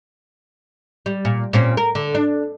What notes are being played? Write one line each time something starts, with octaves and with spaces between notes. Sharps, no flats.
G3
A#2
A#2 C4 C#4
A#4
D3
D4